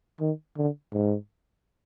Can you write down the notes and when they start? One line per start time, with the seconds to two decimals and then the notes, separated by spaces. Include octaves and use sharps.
0.21 D#3
0.57 D3
0.93 G#2